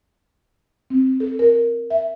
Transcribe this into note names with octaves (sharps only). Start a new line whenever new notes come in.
C4
A4
A#4
E5